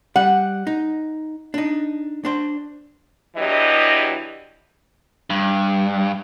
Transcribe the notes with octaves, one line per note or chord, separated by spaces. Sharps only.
G3 F#5
D#4
D4 D#4
D4 C5
E2 E3 F#3 D4 G4 D#5
G2